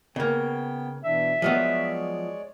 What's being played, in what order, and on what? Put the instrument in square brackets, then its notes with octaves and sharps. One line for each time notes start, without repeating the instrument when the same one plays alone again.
[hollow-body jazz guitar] C#3 A#3 [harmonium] B3 G5
[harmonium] B2 E3 D4 [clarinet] E5
[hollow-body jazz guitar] F3 F#3 B3 [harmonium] G#3 C#5 D5